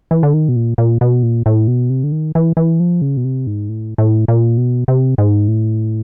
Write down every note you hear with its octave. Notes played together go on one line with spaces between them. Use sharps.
E3
D3
D#3
B2
A#2
A#2
B2
A#2
A2
B2
C3
D3
D#3
E3
E3
F3
C#3
B2
C3
G#2
A2
A2
A#2
B2
C3
G#2
A2